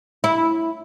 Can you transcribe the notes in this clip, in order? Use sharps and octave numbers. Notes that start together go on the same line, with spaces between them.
E4